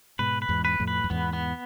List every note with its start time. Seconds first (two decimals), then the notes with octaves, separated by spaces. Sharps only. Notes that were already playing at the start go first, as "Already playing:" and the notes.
0.19 G#2 B2 B4
0.42 B4
0.49 E2 G#2
0.65 B4
0.80 F2 A2
0.88 B4
1.04 F2
1.10 E2 G#2 B3
1.33 B3